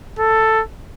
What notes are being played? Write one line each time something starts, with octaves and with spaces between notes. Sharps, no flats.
A4